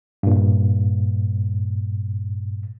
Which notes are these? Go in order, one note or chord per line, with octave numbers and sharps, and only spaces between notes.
G2 A#2